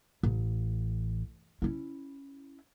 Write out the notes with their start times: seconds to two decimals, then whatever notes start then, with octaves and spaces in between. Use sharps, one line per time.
0.23 A1
1.62 C#4 E4